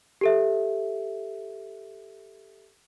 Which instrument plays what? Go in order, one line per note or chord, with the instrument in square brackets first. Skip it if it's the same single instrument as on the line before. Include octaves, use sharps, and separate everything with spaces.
[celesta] G4 A4 E5